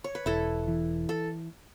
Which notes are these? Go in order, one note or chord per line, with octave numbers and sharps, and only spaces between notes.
C#5
B4
E1 E4 A4
E3
A4